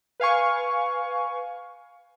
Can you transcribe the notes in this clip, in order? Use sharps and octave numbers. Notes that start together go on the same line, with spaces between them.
B4 F5 G#5 C#6